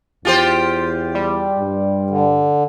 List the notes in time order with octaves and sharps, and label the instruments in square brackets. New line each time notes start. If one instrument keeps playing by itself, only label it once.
[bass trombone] E2 [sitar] F4 G4 C5
[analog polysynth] G3
[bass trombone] G2
[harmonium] D3